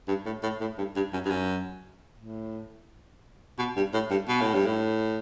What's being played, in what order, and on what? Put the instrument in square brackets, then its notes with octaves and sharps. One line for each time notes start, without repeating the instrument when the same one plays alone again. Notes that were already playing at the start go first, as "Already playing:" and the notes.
[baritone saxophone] G2
A2
A2
A2
G2
G2
F#2
G2
F#2
A2
B2
G2
A2
G2
B2
A2
G2
A2